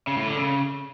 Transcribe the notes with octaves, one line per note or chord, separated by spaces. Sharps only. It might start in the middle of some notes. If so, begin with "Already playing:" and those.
C#3
A2
D3
C#3